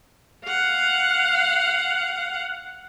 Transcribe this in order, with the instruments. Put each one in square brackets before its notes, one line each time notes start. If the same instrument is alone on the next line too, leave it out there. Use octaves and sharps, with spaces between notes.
[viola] F5 F#5